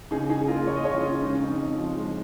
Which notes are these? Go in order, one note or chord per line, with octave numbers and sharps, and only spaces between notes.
C#3 D#4 G#4
C#3 D#4 G#4
A#3 F4 A#4
A#3 C#5
D#5
C#3 G#4 C#5
C#4 F4
C#3
G#3 D#4
C#4
F2 D#4
F2
F3
G#3